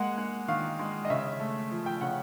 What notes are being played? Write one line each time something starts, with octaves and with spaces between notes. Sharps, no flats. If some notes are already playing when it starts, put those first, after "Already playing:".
Already playing: G#3 A#3 F#5
G#3
D#3 F5
G#3
D#5
C#3 E5
A3
F3
G5
C#3 F#5